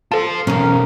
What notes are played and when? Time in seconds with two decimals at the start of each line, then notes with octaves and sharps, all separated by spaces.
0.12 F4 A4 C5 A5
0.47 B1 E2 C#4 A#4